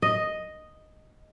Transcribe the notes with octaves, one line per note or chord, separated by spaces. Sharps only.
D#5